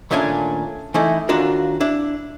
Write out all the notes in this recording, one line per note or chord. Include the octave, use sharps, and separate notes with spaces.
D#2 A#2 A3 C#4 D4 G#5
E3 A3 D#4 E4
D#2 D4 F4 F#4 A#4
D4 E4